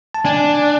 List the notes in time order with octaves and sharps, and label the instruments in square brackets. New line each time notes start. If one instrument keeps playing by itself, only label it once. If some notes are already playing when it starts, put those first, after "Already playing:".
[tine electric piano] A5
[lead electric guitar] D4 [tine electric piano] G#5